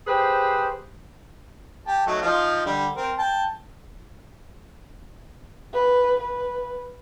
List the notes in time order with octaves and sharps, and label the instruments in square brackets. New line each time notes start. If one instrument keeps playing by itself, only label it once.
[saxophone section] G4 G#4 B4 C5
[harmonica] G4 A5
F#3 A3 D#4
F3 D#4 F4
D3 G3
C4 A#4
G5 A5
[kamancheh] B4
B4